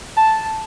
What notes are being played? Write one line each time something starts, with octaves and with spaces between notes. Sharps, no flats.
A5